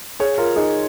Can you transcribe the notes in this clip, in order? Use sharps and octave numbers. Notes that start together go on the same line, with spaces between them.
G#4 C#5
F4 A#4
D#4 G#4